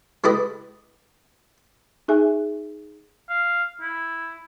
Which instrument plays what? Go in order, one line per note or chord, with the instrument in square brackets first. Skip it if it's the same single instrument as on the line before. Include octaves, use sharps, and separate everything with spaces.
[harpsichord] G#3 A3 E4 G4 B4 D#5
[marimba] D#4 G#4 E5 G#5
[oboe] F5
E4